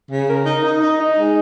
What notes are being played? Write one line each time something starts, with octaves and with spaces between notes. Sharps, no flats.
C#3
A#4
D#4
D#4
D#4
D#4
G#3